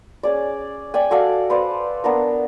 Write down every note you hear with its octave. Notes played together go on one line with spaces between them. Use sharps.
C#4 G#4 D5
D5 G5 G#5
F#4 A4 D5 F5
B4 C5 D5 F5
B3 D4 A#4